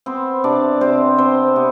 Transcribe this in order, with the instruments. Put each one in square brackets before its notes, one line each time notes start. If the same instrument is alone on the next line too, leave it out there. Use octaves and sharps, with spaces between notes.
[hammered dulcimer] B3 C4 C5
C3 D4 D5
C3 C4 C5
B3 C4 C5
C3 B3